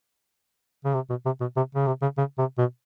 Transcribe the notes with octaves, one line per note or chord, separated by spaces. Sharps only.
C#3
C3
B2
C3
B2
C3
C#3
C3
C#3
C#3
C3
B2